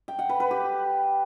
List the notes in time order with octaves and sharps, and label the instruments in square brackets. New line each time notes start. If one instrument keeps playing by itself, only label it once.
[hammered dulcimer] G5
F#5
B4
B4
G4